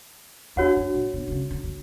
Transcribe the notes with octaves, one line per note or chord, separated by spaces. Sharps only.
E2 D4 F#4 C#5 F#5
F#2
A#2
B2
D3
C#3
D3
D3